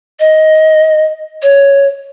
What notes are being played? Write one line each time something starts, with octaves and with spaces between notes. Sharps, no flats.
D#5
C#5